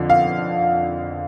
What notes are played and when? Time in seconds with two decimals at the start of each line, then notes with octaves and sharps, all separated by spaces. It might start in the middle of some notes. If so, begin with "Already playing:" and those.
Already playing: F2 D3 F3
0.10 F5